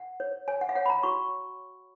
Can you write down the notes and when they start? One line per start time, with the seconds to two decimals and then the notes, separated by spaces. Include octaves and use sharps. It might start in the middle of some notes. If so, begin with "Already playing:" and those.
Already playing: F#5
0.20 C#5
0.48 C#5 G#5
0.61 F#5
0.69 F5
0.75 C#5 F#5
0.86 B5
0.90 A#5
1.03 F#4 C#6